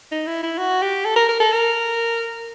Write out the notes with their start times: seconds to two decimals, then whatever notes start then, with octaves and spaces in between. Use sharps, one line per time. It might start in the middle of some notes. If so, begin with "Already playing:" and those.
0.12 D#4
0.27 E4
0.43 E4
0.58 F#4
0.82 G4
1.05 A4
1.16 A#4
1.29 A#4
1.40 A4
1.52 A#4